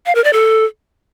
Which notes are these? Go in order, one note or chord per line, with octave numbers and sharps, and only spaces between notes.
F5
A#4
D5
A4